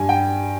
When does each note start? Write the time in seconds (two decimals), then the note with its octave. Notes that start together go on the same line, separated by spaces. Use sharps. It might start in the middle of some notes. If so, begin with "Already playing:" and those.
Already playing: G2 G3 G#5
0.09 G5